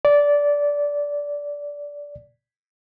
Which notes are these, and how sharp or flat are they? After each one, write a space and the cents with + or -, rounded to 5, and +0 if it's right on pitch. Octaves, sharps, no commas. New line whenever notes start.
D5 -15